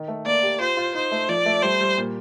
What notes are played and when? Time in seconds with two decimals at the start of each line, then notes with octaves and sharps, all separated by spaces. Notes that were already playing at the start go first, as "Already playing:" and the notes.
Already playing: D#3
0.08 A3
0.26 A#3 D5
0.43 G4
0.60 F4 C5
0.77 F4
0.95 D#4 C5
1.12 A3
1.29 F3 D5
1.46 A3
1.63 G3 C5
1.81 G3
1.98 A#2